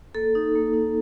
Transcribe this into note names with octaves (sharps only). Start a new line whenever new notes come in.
A#3 A4
D#4
A#3
D#4